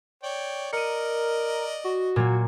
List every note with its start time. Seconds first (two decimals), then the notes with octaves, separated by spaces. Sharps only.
0.23 C#5 D5 G5
0.73 A#4 D5 D#5 C#7 D#7
1.84 F#4
2.16 A#2 F#3 A#3